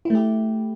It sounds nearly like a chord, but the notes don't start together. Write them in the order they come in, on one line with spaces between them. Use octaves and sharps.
E4 A3 G4